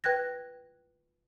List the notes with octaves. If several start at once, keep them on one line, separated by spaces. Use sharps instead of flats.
B4 G5 F#6 G#6 A#6